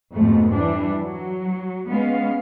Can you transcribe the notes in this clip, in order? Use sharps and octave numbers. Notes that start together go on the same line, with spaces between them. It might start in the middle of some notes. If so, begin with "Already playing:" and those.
F2 G#2 B2 G#3 A3
E3 G3 D4
F#3
G#3 B3 C#4 F5